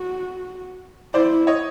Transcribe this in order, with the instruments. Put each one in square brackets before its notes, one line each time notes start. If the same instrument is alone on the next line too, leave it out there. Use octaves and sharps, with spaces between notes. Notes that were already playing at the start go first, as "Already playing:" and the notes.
Already playing: [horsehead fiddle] F#4
[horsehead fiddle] E4 [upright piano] C5 D5
[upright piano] C#5 D#5